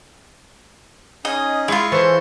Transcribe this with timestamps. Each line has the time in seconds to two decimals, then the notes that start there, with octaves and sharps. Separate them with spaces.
1.25 C#4 D#4 G#4 D#5
1.68 G#3 E4 F4 C6 C#6
1.92 E3 A4 C5 C#5